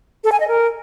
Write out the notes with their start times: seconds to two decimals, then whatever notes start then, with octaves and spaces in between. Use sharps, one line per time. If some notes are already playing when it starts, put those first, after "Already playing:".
0.24 A4
0.32 G#5
0.40 D#5
0.48 A#4